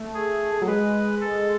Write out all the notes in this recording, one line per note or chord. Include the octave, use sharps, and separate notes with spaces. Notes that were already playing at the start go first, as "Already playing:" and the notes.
Already playing: A3
G#4
F#3
G#3 B4
A4